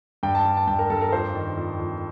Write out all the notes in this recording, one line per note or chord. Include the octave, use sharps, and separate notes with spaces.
G2 G5
A5
G2
A5
G2 G5
A#4
G2 A4
A#4
F2 C5
D#3
F2
F2